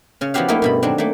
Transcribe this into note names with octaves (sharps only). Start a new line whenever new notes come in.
C#3 C#4
F3 B3 E4 F#4 G4 F5
A3 A#3 D#4 E4 G4 A#4
G2 B2 B5
D#3 F#3 C4 D4
A3 A#3